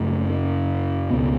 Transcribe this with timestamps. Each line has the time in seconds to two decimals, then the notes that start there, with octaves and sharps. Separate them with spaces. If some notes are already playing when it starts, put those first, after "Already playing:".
Already playing: F#2 C#3 A3
0.29 C#4
1.10 C#2 B2 B3